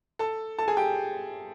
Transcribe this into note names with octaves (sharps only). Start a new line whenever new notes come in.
A4 A5
A4 A5
G#4 G#5
G4 G5